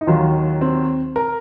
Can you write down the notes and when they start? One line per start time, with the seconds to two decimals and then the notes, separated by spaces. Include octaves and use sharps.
0.01 D#4
0.07 D#2 D#3 F#3 F4
0.61 C4
1.16 A#4